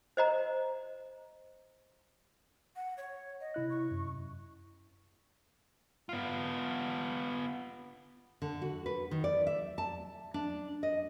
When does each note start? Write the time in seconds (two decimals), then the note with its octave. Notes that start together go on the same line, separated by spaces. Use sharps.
0.17 C5 D#5 A#5
2.76 F#5
2.97 C#5
3.41 D#5
3.54 C3 E4 F#6
3.70 C#6
3.91 F#2
6.09 B3 F4
8.42 D3
8.62 F#4
8.86 B4
9.11 D#3
9.24 D5
9.47 E5
9.78 A5
10.34 D4
10.83 D#5